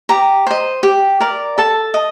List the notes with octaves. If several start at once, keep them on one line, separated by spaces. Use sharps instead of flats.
G4 A#5
C5 D#5
G4
A#4 D5
A4 A5
D#5